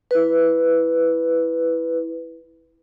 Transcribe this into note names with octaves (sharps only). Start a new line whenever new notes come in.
E4 B4